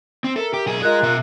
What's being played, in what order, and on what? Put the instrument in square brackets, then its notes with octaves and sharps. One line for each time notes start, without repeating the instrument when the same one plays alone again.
[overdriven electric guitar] C4
[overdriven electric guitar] A4 [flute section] A#4 E5
[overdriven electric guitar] G4
B1 G#4
[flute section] F4 A#4 F#6 [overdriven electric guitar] G#4 D#5
[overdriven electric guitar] B2 E5